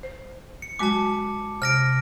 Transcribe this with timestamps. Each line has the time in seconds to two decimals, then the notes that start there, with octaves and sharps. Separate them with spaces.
0.03 C5
0.62 C#7
0.79 F#3 G#3 F#4 A5 D6
1.62 C3 F6 A#6 D7